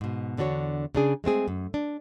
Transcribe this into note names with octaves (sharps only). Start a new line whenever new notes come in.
G#2 B2
E2 D3 D4 F#4 C#5
C#3 D4 G#4
G#3 A3 C4 G#4
F#2
D4